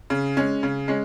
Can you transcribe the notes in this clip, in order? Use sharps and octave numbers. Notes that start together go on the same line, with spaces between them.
C#3
G#3 C#4
C#3
G#3 C#4